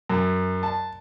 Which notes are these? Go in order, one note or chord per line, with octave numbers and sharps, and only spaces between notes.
F#2
A5